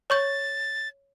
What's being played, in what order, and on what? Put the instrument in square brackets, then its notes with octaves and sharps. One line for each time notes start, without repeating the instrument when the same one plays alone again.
[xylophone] C#5 C#6 G6 [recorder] A6